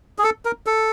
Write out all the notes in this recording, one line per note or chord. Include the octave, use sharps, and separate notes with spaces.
G#4
A4
A#4
A4